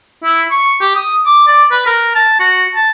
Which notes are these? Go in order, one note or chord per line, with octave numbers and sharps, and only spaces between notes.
E4
C#6
G4
D#6
D6
D5
B4
A#4
A5
F#4
A5